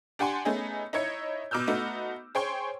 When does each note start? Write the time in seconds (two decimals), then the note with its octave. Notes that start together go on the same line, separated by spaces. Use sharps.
0.19 D4 G4 F#5 G#5 C6
0.45 A3 B3 C#4 D#4 G#4
0.93 D#4 E4 C#5 G#6 C#7
1.51 B2 D6 E6 F6 G6
1.67 A3 B3 D#4 F#4
2.35 G#4 C5 C#5 G5 C6 C#6